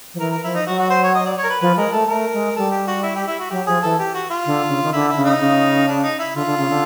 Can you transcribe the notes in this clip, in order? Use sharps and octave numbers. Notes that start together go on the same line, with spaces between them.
F3
E3 A#4
A#4
F3 E4
D#4
F#3 F#4
F#4
C5
C#5
D#5
D5
C#5
A#4
B4
F3 B4
G#3 A#4
A3 A4
A3 A#4
G#3
G3 A4
G4
F#4
E4
G4
E4
F#4
F#3 G4
F3 G#4
E3 A4
G4
F#4
F4
D3
C#3
D#3
D3 E4
E4
C#3
D#4
C#3
D4
D#4
E4
D3 F4
D3
C#3
D3